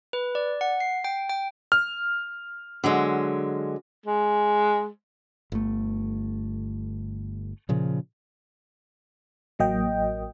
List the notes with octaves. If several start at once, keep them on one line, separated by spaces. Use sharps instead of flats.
B4
D5
F#5
C7
G5
G5
F6
D3 F#3 G#3
G#3
G1 A3
A#2 C#3 F3
A1 F#3 A#3 D#5 G5